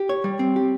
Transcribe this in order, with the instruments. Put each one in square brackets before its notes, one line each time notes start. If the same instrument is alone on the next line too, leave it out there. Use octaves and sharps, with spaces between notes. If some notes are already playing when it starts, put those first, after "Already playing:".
Already playing: [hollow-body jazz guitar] G4
C#5
G3
C4
G4